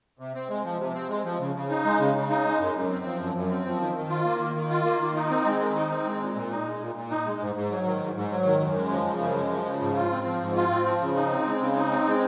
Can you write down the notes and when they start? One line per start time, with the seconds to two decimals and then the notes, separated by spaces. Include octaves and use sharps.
0.19 C3
0.35 C4
0.49 G#3
0.64 F3
0.79 C3
0.94 C4
1.09 G#3
1.25 F3
1.39 C#3
1.55 C#3
1.70 D#4
1.85 G#3
1.99 C#3
2.15 C#3
2.30 D#4
2.45 G#3
2.59 F#2
2.74 F#2
2.90 C4
3.05 F3
3.20 F#2
3.35 F#2
3.50 C4
3.65 F3
3.80 D#3
3.95 D#3
4.10 F4
4.25 A#3
4.40 D#3
4.55 D#3
4.70 F4
4.85 A#3
5.00 D#3
5.15 D#4
5.30 C4
5.45 G#3
5.60 D#3
5.75 D#4
5.90 C4
6.06 G#3
6.21 A#2
6.35 A#2
6.50 D#4
6.65 G#3
6.80 A#2
6.95 A#2
7.10 D#4
7.25 G#3
7.40 G#2
7.55 G#2
7.71 F#3
7.86 D#3
8.00 G#2
8.16 G#2
8.31 F#3
8.46 D#3
8.61 F#2
8.76 G#3
8.90 F3
9.06 C#3
9.21 F#2
9.35 G#3
9.51 F3
9.66 C#3
9.81 G#2
9.96 F4
10.11 C4
10.26 F3
10.41 G#2
10.56 F4
10.71 C4
10.86 F3
11.01 C#3
11.16 D#4
11.31 C4
11.46 G#3
11.61 C#3
11.76 D#4
11.91 C4
12.06 G#3